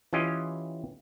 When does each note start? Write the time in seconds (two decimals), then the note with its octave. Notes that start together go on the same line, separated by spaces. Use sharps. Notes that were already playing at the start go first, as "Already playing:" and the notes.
0.13 E3 C#4 F4 G4 D#5